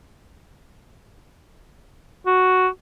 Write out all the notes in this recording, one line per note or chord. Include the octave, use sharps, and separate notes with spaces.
F#4